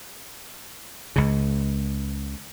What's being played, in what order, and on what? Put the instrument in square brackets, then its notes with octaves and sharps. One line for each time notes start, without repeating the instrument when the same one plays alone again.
[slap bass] C#2 C#3